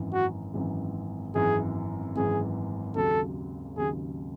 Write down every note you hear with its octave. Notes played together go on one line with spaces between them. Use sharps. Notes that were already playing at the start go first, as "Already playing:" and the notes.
Already playing: G#1 F#2 E3
F#4
G#1 F#2 E3
G#1 F#2 E3 G#4
G#1 F#2 E3 G#4
D#2 C#3 F#3 A4
D#2 C#3 F#3 G#4